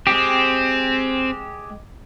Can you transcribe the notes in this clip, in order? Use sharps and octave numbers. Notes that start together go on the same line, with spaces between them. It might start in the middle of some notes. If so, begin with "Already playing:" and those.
G#3 C4 G4